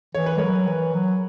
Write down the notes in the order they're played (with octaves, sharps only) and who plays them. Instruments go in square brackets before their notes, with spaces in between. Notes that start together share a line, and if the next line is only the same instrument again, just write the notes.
[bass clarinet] E3 [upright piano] C#5
[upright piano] B4
[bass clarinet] F#3 G#3 [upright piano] A#4 C#5
[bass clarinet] E3
F#3